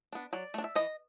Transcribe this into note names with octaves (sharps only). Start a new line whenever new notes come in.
B3 D4
F#3 D5
A3 D4
E5
E3 D#5